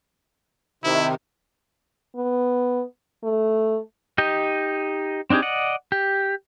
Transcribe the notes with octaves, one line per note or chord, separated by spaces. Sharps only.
C3 D#3 E4
B3
A3
D#4 G4 D#5
C4 D4 D#4 G4 G#4
D5 D#5 F#5
G4